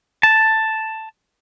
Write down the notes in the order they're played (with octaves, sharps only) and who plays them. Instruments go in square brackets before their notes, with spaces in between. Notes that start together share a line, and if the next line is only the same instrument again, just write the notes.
[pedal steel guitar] A5